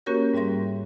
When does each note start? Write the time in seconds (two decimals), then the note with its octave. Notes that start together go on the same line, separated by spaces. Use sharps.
0.06 A#3 C#4 F#4 G4 A#4 C#5
0.34 G#2 G3 E5 C6 A#6